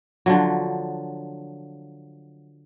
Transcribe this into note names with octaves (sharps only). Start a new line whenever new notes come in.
D3 F3 F#3